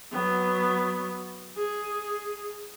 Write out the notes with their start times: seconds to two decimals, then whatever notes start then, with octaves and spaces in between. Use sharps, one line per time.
0.12 F#3 B3
1.57 G#4